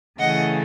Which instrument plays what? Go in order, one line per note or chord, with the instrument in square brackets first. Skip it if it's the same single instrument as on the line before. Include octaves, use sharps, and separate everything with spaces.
[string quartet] C#3 E3 A3 D#5 F#5